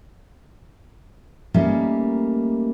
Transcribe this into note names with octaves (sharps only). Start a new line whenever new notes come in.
G3 A3 A#3 C#4 D#4